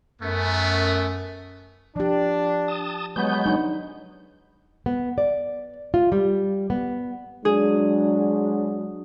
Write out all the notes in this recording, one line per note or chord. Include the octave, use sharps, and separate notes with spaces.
F#2 A3 B3
F3 D4 G4
A5 D#6
F#3 G#3 B3 G6
D4 D#4
B3
D5
F4
G3
B3
F#3 G#3 D4 G#4